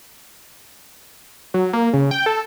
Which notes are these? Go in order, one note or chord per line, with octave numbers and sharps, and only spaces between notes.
F#3
A#3
C#3
G5
A4